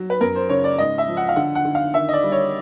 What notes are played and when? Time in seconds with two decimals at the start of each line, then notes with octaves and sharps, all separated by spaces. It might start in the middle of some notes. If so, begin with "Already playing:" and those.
Already playing: F#3
0.10 B4
0.21 F#2 A#4
0.35 C5
0.49 C#3 C#5
0.64 D5
0.78 G#2 D#5
0.98 E5
1.07 F3
1.17 F#5
1.29 F5
1.36 D3 F#5
1.55 F#5
1.65 D3
1.75 F5
1.94 D#3 E5
2.09 D#5
2.13 D5
2.23 G3
2.32 C#5